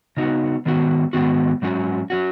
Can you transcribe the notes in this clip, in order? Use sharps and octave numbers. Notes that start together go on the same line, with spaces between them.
C#3 B3 D#4 F#4
G#2 D#3 B3 F#4
G#2 D#3 B3 F#4
G#2 F#3 C#4 F#4
F#3 C#4 F#4